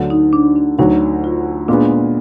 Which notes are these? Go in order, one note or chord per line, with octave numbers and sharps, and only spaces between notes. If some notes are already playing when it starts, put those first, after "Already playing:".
Already playing: D2 D3 F#3
D#4
D4
D4
D2 D3 F#3 D#4
F4
A#2 G#3 B3 D4